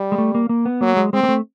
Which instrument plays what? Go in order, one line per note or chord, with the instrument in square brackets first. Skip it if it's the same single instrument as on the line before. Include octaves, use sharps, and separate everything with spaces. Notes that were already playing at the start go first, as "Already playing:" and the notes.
Already playing: [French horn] G3
[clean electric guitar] G#3
A3
A#3
A#3
B3
[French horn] F#3 [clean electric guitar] A#3
[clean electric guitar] G#3
[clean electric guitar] G#3 [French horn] C4
[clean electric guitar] A#3
A3